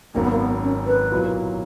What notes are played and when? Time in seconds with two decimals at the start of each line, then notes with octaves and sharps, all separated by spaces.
0.14 G#1 F#2 D#3 A#3
0.22 B3
0.31 A#3
0.39 B3
0.63 C#4
0.87 B4
1.11 B1 A#2 F#3 A#3 E4